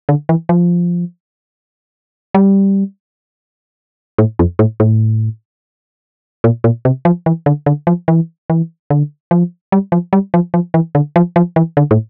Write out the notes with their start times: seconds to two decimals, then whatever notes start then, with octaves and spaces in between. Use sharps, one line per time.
0.09 D3
0.29 E3
0.49 F3
2.35 G3
4.18 A2
4.39 F2
4.59 A2
4.80 A2
6.44 A#2
6.64 A#2
6.85 C3
7.05 F3
7.26 E3
7.46 D3
7.66 D3
7.87 F3
8.08 E3
8.50 E3
8.90 D3
9.31 F3
9.72 G3
9.92 F3
10.13 G3
10.34 F3
10.54 F3
10.74 E3
10.95 D3
11.16 F3
11.36 F3
11.56 E3
11.77 D3
11.91 A2